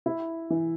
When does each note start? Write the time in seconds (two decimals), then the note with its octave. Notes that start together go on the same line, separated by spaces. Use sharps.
0.06 E4
0.50 E3